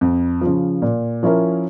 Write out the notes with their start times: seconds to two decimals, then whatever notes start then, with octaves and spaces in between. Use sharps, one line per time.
0.01 F2
0.41 F3
0.47 C#3
0.82 A#2
1.23 F3 C#4 E4 A#4